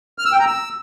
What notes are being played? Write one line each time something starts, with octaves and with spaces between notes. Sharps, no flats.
F6
E6
G5
A#5
E6